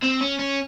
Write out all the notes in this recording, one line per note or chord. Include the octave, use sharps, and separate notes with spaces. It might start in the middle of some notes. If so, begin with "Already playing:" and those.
C4
C#4
C#4